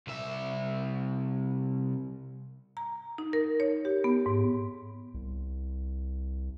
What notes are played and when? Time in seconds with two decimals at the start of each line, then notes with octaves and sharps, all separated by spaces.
0.07 C2 E5
2.77 A#5
3.18 D#4
3.33 A#4
3.60 C#5
3.85 G4
4.04 B3
4.26 G#2
5.14 C2